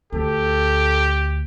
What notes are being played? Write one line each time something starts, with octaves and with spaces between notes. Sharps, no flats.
D2 G4 A4